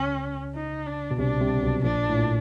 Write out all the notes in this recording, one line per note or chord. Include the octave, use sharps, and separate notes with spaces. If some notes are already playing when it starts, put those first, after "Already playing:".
Already playing: C#2 C#3 C#4
D#4
D4
B2
C2 C3 D4
C2 C3
B1 B2
A#1 A#2 D4
A2
A#2